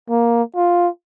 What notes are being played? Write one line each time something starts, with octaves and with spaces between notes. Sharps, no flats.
A#3
F4